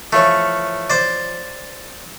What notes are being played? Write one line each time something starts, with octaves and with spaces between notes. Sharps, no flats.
E3 F3 A3 C#5
C5 D5